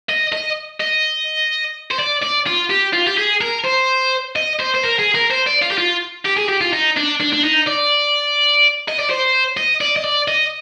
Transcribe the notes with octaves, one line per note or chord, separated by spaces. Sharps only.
D#5
D#5
D#5
C5
D5
D5
F4
G4
F4
G4
G#4
A#4
C5
D#5
C5
C5
A#4
G#4
A#4
C5
D5
F4
G4
F4
G4
G#4
G4
F4
D#4
D4
D4
D4
D#4
D5
D#5
D5
C5
D#5
D5
D#5
D5
D#5